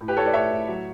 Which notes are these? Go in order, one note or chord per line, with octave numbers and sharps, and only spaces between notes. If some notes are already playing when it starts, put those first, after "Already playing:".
A2
G4 B4
A2 A4 C#5
B4 D5
A2 C#5 E5
A2
F#3